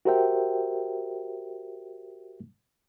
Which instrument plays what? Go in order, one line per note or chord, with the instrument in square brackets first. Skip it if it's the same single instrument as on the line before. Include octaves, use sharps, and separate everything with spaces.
[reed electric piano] F#4 G4 A#4 C5 E5 G5